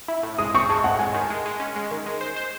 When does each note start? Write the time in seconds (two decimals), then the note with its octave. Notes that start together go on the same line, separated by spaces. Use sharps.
0.08 E4
0.23 A2
0.38 G#3 D#6
0.55 C4 C#6
0.70 G#3 A5
0.84 A2 F#5
0.99 G#3 G#5
1.14 D#3
1.30 G#3
1.45 G#3
1.60 C#4
1.76 G#3
1.91 D#3
2.06 G#3
2.21 C5
2.36 C5